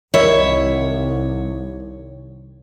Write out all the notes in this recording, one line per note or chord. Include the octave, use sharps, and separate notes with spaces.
C2 D#3 E4 C#5 E5